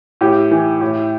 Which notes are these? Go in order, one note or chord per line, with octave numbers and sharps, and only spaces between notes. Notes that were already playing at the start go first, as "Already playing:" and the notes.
A2 G4
E3
A2